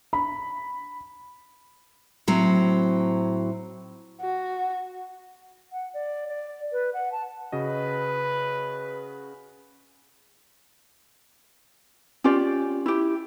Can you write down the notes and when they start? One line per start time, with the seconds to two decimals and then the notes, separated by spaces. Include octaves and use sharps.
0.13 B5
2.28 A2 F#3 C4
4.21 F#4
5.72 F#5
5.94 D5
6.28 D5
6.72 B4
6.94 F#5
7.12 A5
7.52 C#3 F#4 B4 D#5
12.24 C#4 F4 G4 D5
12.86 E4 G4